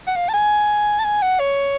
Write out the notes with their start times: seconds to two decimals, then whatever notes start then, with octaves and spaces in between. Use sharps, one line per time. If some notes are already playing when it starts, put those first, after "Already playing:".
0.07 F#5
0.16 F5
0.29 A5
0.33 G#5
0.99 A5
1.05 G#5
1.22 F#5
1.40 C#5